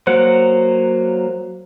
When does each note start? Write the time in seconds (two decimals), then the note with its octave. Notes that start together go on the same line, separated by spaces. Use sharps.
0.07 F#3 A#3 C5 F#5